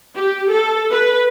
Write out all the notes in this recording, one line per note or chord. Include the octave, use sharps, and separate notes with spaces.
G4
A4
B4